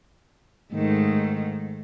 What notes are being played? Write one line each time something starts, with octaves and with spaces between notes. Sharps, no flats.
G#2 D#3 A3